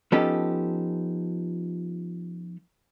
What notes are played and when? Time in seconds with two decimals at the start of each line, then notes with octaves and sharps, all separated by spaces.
0.12 F3 B3 C#4 D#4 G4 A4